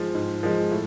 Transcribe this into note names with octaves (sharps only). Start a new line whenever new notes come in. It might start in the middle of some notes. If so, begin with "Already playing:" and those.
Already playing: G#2 F3 G#3
G#2
F3 G#3
A2